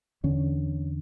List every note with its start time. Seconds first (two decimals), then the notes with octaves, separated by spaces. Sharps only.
0.24 E2 D3 C#4